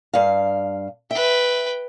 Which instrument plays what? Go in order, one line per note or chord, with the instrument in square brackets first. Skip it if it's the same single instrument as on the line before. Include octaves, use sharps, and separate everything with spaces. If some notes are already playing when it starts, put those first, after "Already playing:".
[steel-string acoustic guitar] G2 F5
[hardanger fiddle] B4 G5 [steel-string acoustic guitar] E5